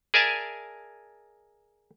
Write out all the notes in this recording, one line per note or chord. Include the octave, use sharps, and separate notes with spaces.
G#4 A#4 D5 E5 G#5 A5